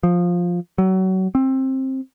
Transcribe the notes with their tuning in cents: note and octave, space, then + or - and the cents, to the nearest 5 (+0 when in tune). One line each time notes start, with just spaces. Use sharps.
F3 +10
F#3 +30
C4 +20